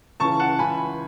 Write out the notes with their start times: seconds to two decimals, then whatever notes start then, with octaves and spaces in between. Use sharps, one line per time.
0.20 C#2 C#3 E3 A5 C#6
0.40 F#5 A5
0.59 C#2 C#3 E3 G#5 B5